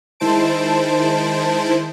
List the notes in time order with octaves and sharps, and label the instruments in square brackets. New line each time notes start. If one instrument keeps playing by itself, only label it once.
[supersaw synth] D#3 G#3 E4 C5 A5 D7